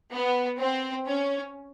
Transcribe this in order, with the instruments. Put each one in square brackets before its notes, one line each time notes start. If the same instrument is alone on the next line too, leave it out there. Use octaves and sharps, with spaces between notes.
[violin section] B3
C4
C#4